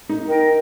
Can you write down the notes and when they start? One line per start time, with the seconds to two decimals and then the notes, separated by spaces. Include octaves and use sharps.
0.09 D#4
0.27 A#4 D#5 G5